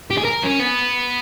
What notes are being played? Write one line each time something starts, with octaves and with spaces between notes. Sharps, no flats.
G4
G#4
A#4
C#4
B3